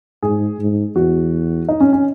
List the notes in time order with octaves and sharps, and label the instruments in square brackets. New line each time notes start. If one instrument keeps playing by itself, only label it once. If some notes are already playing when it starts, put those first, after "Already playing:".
[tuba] G#2 [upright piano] G#4
[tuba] G#2
[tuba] E2 [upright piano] F#4
[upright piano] D#4
C#4
C#4